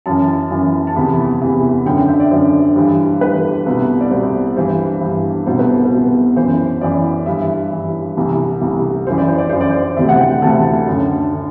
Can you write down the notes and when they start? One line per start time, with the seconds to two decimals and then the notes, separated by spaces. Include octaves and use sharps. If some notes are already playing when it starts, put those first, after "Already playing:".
0.06 F#2 E3 A5
0.51 F#2 E3
0.87 A5
0.96 E2 C3 E3 B5
1.42 E2 C3 E3
1.86 F#2 D3 G5
1.97 G5
2.09 E5
2.20 D5
2.31 F#2 D3 C5
2.76 G2 E3
3.21 G2 E3 B4
3.66 C2 B2
4.01 D5
4.11 C2 B2 C5
4.56 G2 E3 C5
5.01 G2 E3
5.46 C2 B2 C5
5.59 B4
5.85 B4
5.92 C2 B2
6.36 F#2 E3 C5
6.81 F#2 E3 D5
7.26 G2 E3 E5
7.71 G2 E3
8.17 C2 C3 E3
8.61 C2 C3 E3
9.07 F#2 E3 C5
9.18 D5
9.28 C5
9.38 D5
9.49 F#2 E3 C5
9.61 D5
9.70 C5
9.97 D2 C3 E3 E5
10.09 F#5
10.19 G5
10.42 D2 C3 E3 A5
10.86 F#2 D3
11.32 D3